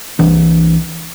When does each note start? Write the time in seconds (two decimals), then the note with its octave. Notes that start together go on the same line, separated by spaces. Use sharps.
0.19 C2 E3 D4